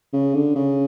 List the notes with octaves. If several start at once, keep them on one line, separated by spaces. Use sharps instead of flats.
C#3
D3
C#3